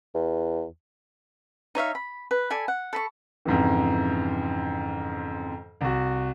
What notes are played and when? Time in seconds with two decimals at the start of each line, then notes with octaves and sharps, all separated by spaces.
0.15 E2
1.75 D#4 C#5 E5 F5
1.95 B5
2.31 B4
2.50 A4 D5 G#5 B5
2.68 F#5
2.93 A4 B5 C#6
3.45 F2 G#2 C#3 E3
5.81 C2 F#4